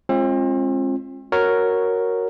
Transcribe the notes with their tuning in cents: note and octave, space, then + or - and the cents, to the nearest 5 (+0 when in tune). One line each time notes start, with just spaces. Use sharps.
G#3 +0 C4 +40 F4 +0
F#4 +0 A#4 +0 C#5 +0